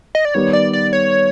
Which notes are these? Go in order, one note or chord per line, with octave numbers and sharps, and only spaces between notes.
D#5
D5
D#3 G3 B3 C#5
D5
D5
C#5